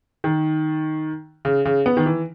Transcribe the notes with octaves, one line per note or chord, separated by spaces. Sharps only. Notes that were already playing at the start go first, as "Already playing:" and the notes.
D#3
C#3
C#3
B3
D#3
E3